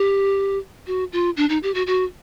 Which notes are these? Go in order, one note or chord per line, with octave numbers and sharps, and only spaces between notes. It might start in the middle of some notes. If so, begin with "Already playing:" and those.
Already playing: G4
F#4
F4
D4
D#4
G4
F#4
F#4